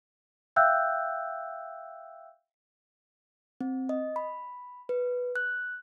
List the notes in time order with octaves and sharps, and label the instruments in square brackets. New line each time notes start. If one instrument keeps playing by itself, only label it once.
[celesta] E5 F5 G5 E6 F#6 G6
[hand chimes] C4
D#5
B5
B4
F#6